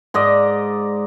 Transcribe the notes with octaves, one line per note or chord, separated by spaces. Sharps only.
G#2 D5 D#5